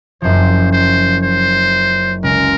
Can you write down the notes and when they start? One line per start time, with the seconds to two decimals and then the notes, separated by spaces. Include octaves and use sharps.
0.22 F#1 F#2 F3 C5
0.72 C5
1.23 C5
2.23 C#2 C#3 G#3 A#4